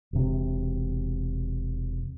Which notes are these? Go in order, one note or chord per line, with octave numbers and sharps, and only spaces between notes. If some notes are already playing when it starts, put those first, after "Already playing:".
E1 C3